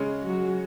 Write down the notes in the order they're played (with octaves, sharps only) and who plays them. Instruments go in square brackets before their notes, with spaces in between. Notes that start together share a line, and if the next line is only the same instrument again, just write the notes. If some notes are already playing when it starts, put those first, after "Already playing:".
Already playing: [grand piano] C#3 G#3 C#4
[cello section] F#3 F#4